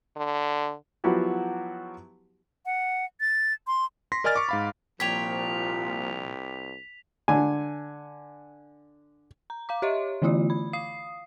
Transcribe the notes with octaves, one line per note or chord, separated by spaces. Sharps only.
D3
F3 F#3 B3 E4 F#4 G4
F#5
A6
C6
C6 A#6 B6
A#4 D5 D#5 G#5 F6 A6
C#6 D6
G#2 F5 B5
C2 A#2 F3 G4 C#5 B6 F7
D3 G#5
A#5
F5 A#5 D6
G4 C#5 D#5 E5 C6
D3 E3 A3 E4 F4 D5
B5
F5 D#6 C7